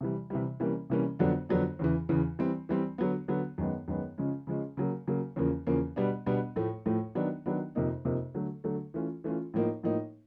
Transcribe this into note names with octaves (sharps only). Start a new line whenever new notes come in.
C3 E3 G3
C3 E3 G3
C3 E3 G3 A#3 C#4
C3 E3 G3 A#3 C#4
F2 D3 F#3 B3 D4
F2 D3 F#3 B3 D4
E2 C#3 E3
E2 C#3 E3
E3 G3 C4
E3 G3 C4
D3 F#3 B3
D3 F#3 B3
F#2 D#3 G#3 B3
F#2 D#3 G#3 B3
C#3 F3 G#3 C#4
C#3 F3 G#3 C#4
C#3 F#3 A#3
C#3 F#3 A#3
E2 C#3 F3 A#3 C#4
E2 C#3 F3 A#3 C#4
B2 G3 B3 D4
B2 G3 B3 D4
A2 F3 A3
A2 F3 A3
D#3 F#3 B3 D4
D#3 F#3 B3 D4
F2 C3 F3 A#3 D#4
F2 C3 F3 A#3 D#4
D3 F#3 A3
D3 F#3 A3
E3 A3 C#4 F4
E3 A3 C#4 F4
A2 F3 A#3 D#4
A2 F3 A#3 D#4